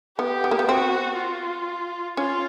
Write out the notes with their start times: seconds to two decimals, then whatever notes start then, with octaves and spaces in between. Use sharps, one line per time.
0.18 B3 G4
0.44 B3
0.51 A#3
0.59 B3
0.68 C4 F#4
1.18 F4
2.17 C#4 F4